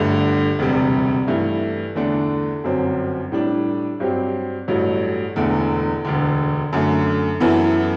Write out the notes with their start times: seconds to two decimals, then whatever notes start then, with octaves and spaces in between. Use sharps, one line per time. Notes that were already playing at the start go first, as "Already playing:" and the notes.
Already playing: G1 G2 D3 A3
0.59 E1 D2 C3 G3
1.27 G2 E3 A3 E4
1.95 E2 D3 A3 D4
2.64 G1 F#2 F#3 C4
3.32 A2 G3 D4
4.00 G2 F#3 C4 G4
4.68 A1 G2 F#3 A3
5.36 E1 E2 D3 A3
6.05 E1 D2 D3
6.73 F#2 D3 A3
7.40 F#2 E3 B3 E4 A4